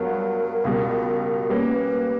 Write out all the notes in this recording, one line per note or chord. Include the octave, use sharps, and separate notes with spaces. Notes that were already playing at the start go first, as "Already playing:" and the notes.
Already playing: G2 F#3 B3 A#4
C#2 B2 G3
G3 A#3 C#4 B4